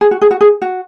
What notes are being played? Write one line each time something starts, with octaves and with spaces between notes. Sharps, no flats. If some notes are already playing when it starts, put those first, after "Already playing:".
G#4
F#4
G#4
F#4
G#4
F#4